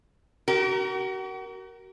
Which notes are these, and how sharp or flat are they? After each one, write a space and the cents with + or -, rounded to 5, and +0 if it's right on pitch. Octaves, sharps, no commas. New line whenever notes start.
F#4 +40 A#4 +0